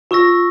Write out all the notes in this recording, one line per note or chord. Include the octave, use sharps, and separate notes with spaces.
F4 C#6 E6 A#6